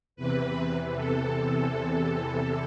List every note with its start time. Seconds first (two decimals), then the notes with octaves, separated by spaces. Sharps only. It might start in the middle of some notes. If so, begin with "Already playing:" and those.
0.16 E2 C3 E3 B4
0.95 A4